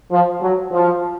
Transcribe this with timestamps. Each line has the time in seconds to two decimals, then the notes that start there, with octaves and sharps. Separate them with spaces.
0.11 F3
0.41 F#3
0.72 F3